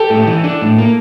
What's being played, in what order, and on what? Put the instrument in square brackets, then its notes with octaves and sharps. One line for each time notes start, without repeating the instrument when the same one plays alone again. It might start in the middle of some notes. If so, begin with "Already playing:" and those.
Already playing: [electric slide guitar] G4 [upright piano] A4
[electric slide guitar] A2
E3
D4
A2
A#3